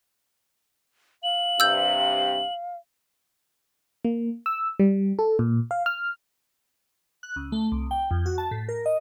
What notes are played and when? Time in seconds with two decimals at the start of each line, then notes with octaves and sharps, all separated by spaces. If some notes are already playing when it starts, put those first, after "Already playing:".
1.23 F5 F#7
1.60 G2 C3 E6 G6
4.05 A#3
4.46 E6
4.80 G3
5.19 A4
5.39 A#2
5.71 F5
5.86 F6
7.23 F#6
7.36 C#2
7.52 A3
7.72 C2
7.91 G5
8.11 F2
8.26 F#4
8.38 A5
8.51 A2
8.69 A#4
8.86 D#5